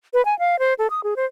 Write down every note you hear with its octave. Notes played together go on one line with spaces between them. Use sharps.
B4
G#5
F5
C5
A4
D#6
G#4
C5